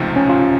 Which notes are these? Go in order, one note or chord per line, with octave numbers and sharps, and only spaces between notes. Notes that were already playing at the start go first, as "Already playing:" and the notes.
Already playing: C#2 C3 F3 A3 D#4
C#4
F4